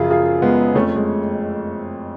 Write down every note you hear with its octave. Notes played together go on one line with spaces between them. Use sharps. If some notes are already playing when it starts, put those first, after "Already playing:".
Already playing: F#2 C#3 F3 F4 G#4
F4 G#4
G#3 B3
F2 F3 A3 C#4
G#3